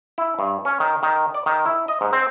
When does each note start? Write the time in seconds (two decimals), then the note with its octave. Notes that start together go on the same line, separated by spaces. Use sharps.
0.18 E4
0.39 G2
0.65 C#4
0.80 D#3
1.03 D#3
1.34 D5
1.46 D#3
1.66 E4
1.88 D#5
2.01 G#2
2.13 C4